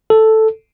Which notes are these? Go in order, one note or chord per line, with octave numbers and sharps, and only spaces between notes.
A4